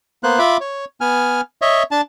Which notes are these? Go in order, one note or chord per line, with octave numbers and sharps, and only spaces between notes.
A#3 B3 C5 F#6
F4 E5 B5 D6
C#5
B3 G#5 F6
C#5 D#5 E5
D4 A5